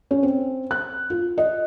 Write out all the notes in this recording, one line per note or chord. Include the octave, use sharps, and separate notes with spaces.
C#4
C4
F#6
F4
D#5